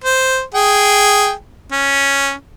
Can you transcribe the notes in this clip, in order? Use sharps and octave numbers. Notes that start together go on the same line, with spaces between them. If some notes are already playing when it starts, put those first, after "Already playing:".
C5
G#4 G5
C#4